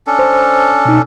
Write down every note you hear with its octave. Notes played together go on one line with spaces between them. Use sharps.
C#4 D4 A4
C5
B2 D#4